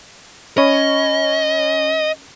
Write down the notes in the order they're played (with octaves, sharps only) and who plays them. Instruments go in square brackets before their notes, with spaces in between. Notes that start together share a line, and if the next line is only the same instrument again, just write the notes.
[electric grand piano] C#4 C#5 B5 [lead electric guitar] D#5